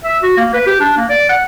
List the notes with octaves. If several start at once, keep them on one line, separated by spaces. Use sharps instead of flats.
E5
F#4
A#3
B4
G4
D4
A#3
D5
F#5